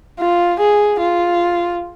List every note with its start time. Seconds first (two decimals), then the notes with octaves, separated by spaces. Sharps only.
0.20 F4
0.60 G#4
1.00 F4